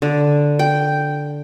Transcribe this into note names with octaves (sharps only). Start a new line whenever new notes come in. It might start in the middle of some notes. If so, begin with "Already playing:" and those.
D3
G5